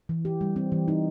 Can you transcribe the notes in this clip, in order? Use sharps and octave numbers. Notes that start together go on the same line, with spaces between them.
E3
G4
G3
C4
E3
D#4